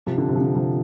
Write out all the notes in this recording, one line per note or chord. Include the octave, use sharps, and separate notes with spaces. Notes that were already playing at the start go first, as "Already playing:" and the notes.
C3 F3
D3
C3
F3
D3
C3 F3